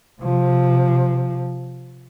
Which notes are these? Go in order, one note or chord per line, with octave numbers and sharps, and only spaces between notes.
C3 F3